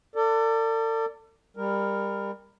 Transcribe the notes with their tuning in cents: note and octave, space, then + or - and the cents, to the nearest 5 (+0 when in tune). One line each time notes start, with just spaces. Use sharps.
A4 +40 D5 +0
G3 +25 A#4 +0